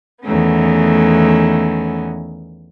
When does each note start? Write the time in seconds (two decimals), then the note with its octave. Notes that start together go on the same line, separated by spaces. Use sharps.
0.23 E2 D#3 A3 B3 C#4